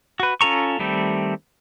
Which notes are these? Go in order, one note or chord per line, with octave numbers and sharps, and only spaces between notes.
F#4 B4
C#4 F4 A4 A#5 C#6
D#3 G3 A3 C4